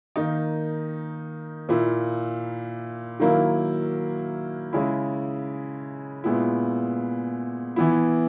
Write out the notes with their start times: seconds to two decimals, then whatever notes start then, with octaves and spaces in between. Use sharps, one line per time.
0.16 D#3 A#3 D#4
1.69 A#2 A#3 E4
3.20 D#3 F#3 A#3 E4
4.73 C#3 G#3 C#4 E4
6.24 A#2 G#3 B3 E4
7.76 E3 B3 E4